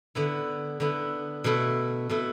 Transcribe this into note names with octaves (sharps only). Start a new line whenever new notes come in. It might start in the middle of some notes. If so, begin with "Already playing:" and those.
D3 B3 E4
D3 B3 E4
B2 A3 E4
B2 A3 E4